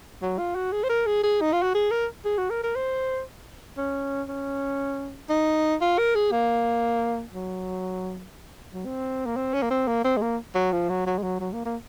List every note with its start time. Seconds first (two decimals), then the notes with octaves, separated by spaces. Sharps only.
0.22 F#3
0.38 F4
0.55 F#4
0.72 G#4
0.83 C5
0.89 A#4
1.06 G#4
1.23 G#4
1.41 D#4
1.53 F4
1.63 F#4
1.74 G#4
1.91 A#4
2.25 G#4
2.38 F#4
2.50 A#4
2.63 A#4
2.76 C5
3.77 C#4
4.28 C#4
5.29 D#4
5.81 F4
5.98 A#4
6.15 G#4
6.31 A#3
7.33 F#3
8.73 F#3
8.86 C4
9.26 A#3
9.36 C4
9.53 C#4
9.62 A#3
9.70 C4
9.88 A#3
10.04 C4
10.17 G#3
10.22 A#3
10.55 F#3
10.73 F3
10.89 F#3
11.06 F#3
11.18 G#3
11.23 F#3
11.40 F#3
11.53 A#3
11.65 A#3